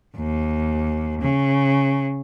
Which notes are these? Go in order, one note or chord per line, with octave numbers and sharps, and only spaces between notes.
D#2
C#3